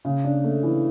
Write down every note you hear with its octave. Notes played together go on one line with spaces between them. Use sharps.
C#3
D4
A3
E3